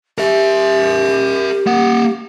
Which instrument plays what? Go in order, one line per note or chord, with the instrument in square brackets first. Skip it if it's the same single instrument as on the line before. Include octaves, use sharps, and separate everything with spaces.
[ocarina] G4 [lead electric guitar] A#4 E5
[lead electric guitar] A#3 F#5